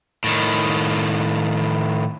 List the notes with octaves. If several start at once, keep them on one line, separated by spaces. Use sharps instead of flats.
A2 D#3